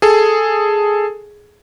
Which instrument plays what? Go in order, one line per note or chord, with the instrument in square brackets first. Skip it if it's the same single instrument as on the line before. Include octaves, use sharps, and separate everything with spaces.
[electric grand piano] G#4 A4